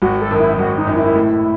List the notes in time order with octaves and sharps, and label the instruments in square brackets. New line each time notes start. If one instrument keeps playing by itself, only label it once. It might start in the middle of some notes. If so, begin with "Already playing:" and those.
[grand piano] G#1 [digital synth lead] F#4
[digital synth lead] A4
[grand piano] F#2 D#3
[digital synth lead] E4
[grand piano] G#1 [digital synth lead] F#4
[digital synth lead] D#4
[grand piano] F#2 D#3
[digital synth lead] E4
[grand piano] A2